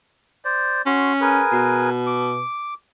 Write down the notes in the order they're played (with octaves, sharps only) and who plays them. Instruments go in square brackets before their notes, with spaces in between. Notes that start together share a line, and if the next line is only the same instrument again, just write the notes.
[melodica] C5 D5
[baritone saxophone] C#4 [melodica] F#4 C6
[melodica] G#4 A#4 B4
[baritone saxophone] B2
[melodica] D6